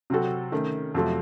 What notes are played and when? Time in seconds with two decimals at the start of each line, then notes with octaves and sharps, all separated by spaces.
0.10 C3 F#3 C4 F#4 A4
0.52 D#3 A3 C#4
0.94 F2 C3 F#3 A3